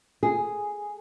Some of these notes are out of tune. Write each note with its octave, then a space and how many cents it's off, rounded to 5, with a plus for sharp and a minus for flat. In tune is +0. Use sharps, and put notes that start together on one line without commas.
G#4 -5